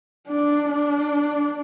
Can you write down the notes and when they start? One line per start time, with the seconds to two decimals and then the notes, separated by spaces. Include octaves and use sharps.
0.28 D4
0.71 D4